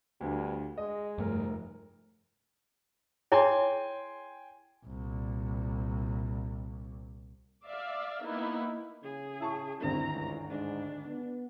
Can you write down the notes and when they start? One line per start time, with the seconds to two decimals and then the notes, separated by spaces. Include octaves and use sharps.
0.21 D2 G2 D3
0.78 G#3 D#5
1.18 F1 G2 A3 A#4
3.32 E4 G#4 C#5 G5 G#5 C6
4.85 C2 A#2
7.66 D5 E5 F5
8.23 A#3 B3 D#4 E4
9.04 C#3 G#4
9.40 E4 A5 C#6
9.82 G#1 D2 G2 C4 E4 A#5
10.13 C#2
10.50 G#2 D4
11.07 B3